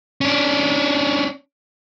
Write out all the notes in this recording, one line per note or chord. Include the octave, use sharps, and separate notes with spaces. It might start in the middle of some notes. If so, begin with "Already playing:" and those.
C#4 D4